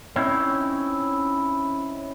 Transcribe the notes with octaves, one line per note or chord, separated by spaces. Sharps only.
C4 C#4 D#4 E4 C#5